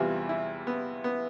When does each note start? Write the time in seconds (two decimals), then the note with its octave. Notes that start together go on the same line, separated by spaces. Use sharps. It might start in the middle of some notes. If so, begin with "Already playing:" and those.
Already playing: E2 C3 E3 G3 F4
0.29 E4
0.67 B3
1.04 B3